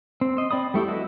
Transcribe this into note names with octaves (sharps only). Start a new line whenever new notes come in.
C4
C5 D#5
C4 D5 B5 D#6
G3 A3 E4 G4
E4 F#4 B4 D#5 E5